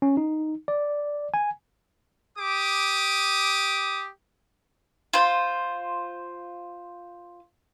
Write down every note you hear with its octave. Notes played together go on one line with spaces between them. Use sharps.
C#4
D#4
D5
G#5
G4 D6 D#6
F4 C5